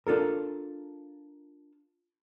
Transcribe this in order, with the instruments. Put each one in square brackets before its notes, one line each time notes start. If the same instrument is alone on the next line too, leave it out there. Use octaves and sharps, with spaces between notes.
[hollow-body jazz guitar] D4 F4 A4 A#4